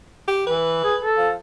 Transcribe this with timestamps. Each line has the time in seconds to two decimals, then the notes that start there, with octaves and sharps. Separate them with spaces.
0.28 G4
0.47 E3 B4
0.84 G#4
1.00 A4
1.17 F3